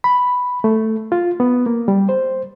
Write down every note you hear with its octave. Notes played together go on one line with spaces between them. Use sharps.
B5
A3
F4
B3
A#3
G3
C5